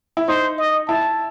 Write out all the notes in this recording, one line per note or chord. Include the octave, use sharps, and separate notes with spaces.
E4
D#4 C5
D#5
E4 A5